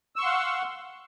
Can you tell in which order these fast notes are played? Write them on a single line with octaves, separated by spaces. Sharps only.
E6 C#6 C6 F#5 F5